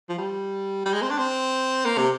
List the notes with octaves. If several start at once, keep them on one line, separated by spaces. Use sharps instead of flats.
F3
G3
G3
G#3
C4
D4
C4
A#3
C3